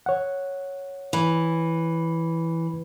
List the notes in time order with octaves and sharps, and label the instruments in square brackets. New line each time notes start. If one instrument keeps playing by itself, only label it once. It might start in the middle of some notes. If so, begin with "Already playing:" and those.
[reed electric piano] C#5 F#5
[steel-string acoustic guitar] E3